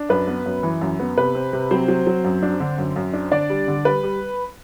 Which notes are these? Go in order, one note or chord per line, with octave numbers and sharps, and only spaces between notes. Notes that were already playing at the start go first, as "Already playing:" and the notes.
Already playing: D4
F#2 B4
B3
F#2
E3
F#2
B3
C3 B4
C4
C3
F#3 C4 C5
F#3
F#3
F#2
D4
D3
F#2
F#2
D4
D3 D4 D5
G3
D3
G3 B4
G3